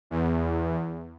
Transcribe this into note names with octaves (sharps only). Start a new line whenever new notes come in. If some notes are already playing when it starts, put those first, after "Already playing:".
E2